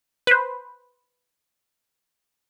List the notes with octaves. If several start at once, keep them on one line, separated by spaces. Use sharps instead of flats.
B4 C5